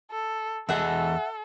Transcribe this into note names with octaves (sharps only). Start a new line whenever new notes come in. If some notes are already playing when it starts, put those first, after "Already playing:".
A4
E2 G#4 A4 D#5 E5 F#5